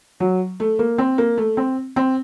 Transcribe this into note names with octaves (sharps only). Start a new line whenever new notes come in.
F#3
A3
A#3
C4
A#3
A3
C4
C4